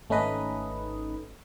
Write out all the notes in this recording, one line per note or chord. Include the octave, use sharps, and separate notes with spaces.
G#1 A3 C#4 D#4 B4 D#5